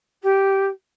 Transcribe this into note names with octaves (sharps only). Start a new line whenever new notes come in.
G4